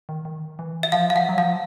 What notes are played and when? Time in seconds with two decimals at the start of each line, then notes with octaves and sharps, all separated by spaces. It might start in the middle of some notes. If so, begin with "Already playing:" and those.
0.09 D#3
0.25 D#3
0.59 E3
0.83 E5
0.92 F3 F5
1.10 F5
1.15 F3 F#5
1.29 F#3
1.38 F3 F5